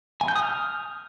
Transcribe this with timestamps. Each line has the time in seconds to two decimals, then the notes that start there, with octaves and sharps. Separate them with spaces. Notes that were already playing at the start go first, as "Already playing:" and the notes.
0.21 G#5
0.28 G6
0.36 D#6
0.43 F6